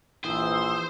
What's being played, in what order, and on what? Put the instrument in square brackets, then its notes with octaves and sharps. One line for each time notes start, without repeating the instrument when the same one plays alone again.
[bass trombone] A#1 [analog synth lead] E3 [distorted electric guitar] C5 [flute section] D#6 E6